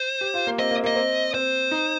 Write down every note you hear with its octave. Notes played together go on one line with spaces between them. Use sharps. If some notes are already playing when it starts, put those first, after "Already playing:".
Already playing: C5
G4
F4
A#3
C4 D#5
A#3
A#3 D#5
C4
C4 C5
D#4